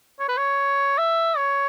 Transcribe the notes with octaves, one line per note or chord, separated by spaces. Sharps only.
C#5
B4
C#5
E5
C#5